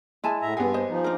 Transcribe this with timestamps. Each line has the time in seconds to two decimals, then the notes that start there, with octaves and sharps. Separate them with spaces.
0.24 G#3 E4 G#5 A5
0.42 A2 E5 A#5
0.57 G2 B3 G4 G#4 F#5
0.74 C5 D#5
0.90 F3 D#4
1.04 D4 A#4 F5 A#5 D6